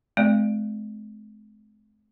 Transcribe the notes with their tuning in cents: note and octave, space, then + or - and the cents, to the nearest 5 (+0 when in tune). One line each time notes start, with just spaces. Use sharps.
G#3 +40 C4 -25 D5 +20